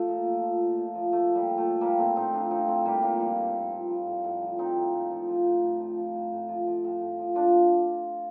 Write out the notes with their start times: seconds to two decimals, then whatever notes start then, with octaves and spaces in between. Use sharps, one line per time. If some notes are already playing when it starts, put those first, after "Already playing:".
Already playing: F3 A3
0.08 A#2
0.25 F3
0.42 F3
0.60 A#2
0.77 A#2
0.95 F3
1.13 F3 A3
1.29 A#2
1.35 G3
1.47 A#2
1.58 A3
1.64 F3
1.81 F3 G3 A#3
1.98 A2 A3 C4
2.15 A2 C4 D#4
2.33 F3 D4 F4
2.51 F3 C4 D#4
2.68 A2 A3 C4
2.85 A2 G3 A#3
3.02 F3 G3 A#3
3.19 F3 G3
3.37 A2
3.55 A2
3.71 F3
3.90 F3
4.06 A2
4.24 A2
4.41 F3
4.58 F3 C4 D#4
4.76 A2
4.93 A2
5.11 F3
5.28 F3
5.45 A2
5.63 A2
5.80 F3
5.97 F3
6.14 A2
6.32 A2
6.48 F3
6.67 F3
6.84 A2
7.01 A2
7.18 F3
7.35 F3 D4 F4